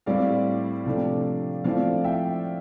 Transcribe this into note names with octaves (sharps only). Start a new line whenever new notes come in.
A2 G3 C4 E4 D5 F5
C3 F3 A3 D4
F3 A3 C4 E4 D5 F5
E5 G5